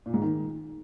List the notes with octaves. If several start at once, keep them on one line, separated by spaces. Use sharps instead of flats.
A#2
G#2
D#3